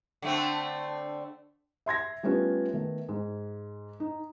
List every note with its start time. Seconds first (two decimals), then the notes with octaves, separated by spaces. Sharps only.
0.22 D3 A3 C4
1.86 E5 C6 G#6 A#6
2.23 G3 A3 B3 C#4 F4
2.73 D#3 A3 B3
3.09 G#2
4.00 D#4